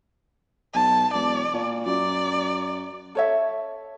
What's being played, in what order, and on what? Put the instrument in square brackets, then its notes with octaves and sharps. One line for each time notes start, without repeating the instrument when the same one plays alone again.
[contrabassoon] B1 [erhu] A5
[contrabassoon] E1 [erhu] D5
[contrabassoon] A#2
[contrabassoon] F#2 [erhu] D5
[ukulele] A4 C#5 E5